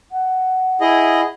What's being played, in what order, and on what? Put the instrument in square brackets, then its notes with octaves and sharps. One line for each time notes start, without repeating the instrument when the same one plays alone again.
[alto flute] F#5
[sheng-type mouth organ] E4 G#4 D#5